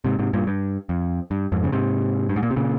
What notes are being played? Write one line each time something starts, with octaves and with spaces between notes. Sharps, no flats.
G#2 C3
G#2 C3
G2 A#2
G2
F2
G2
F2 G#2
C#3
G#2 C3
G2
G#2
A#2
C3
A#2 C#3